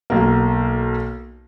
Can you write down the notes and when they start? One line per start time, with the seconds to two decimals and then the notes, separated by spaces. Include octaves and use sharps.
0.10 B1 A#3